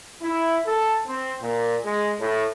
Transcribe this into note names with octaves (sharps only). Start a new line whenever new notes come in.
E4
A4
C4
A#2
G#3
A2